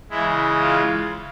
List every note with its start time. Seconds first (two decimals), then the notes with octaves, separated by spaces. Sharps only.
0.10 C#3 E3 G#3 E4
0.61 F4